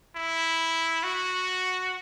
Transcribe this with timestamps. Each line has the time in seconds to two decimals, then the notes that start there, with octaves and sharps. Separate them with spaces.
0.16 E4
1.03 F#4